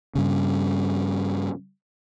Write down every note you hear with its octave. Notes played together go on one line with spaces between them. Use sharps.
G2 C#3